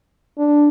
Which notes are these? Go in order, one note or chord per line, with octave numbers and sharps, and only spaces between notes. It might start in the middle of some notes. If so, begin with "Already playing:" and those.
D4